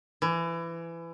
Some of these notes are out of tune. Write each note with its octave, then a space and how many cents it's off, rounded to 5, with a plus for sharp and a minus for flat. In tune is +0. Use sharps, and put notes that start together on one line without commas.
E3 +25